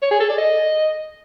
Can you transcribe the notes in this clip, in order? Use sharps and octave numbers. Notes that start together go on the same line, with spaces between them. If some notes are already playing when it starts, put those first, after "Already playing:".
C#5
G#4
A4
D5
D#5